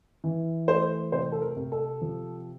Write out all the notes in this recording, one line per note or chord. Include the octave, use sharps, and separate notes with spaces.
E3
A3 C5
C3 C5
A4
A#4
C3
A4
F3